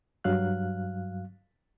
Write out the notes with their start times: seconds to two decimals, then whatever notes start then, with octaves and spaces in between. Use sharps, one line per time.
0.24 G2 F#3 F5 F#6